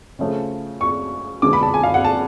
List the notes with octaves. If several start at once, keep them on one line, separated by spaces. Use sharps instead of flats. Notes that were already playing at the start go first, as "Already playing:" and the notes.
C#3 F3 A3 C#4
C#6
D3 G#3 B3 D4 D6
B5
A5
G#5
F5
F#5
A5